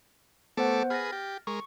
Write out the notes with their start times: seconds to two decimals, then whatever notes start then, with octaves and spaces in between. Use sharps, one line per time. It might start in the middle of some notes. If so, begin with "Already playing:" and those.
0.57 A3 B3 A4 C5 F#5 D6
0.90 G#4 B4 F6 A6 A#6
1.12 G4
1.47 G#3 A#4 C#6